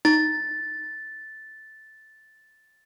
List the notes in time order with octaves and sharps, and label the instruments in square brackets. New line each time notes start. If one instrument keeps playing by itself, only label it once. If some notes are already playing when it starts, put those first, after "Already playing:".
[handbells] D#4 [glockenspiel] A6